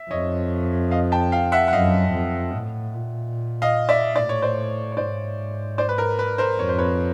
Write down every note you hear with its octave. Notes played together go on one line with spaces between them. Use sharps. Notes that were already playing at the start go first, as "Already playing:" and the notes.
Already playing: E5
F2 C#5 D#5
D#5 F5
G5 A5
F5 G5
E5 F#5
F#5
F#2 D#5 F5
F2
A2
A#2
D#5 F5
D5 E5
A2 D5
C#5
C5 D5
C#5
G#2 C5 D5
C5 D5
B4
A#4
B4
A#4 C5
F2 C#5
C5
B4 C#5